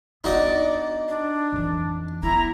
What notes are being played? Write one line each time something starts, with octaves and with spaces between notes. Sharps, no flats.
B3 D4 D#4 F#4 D5 D#5
D4
F2 E3
A3 B3 E4 A#5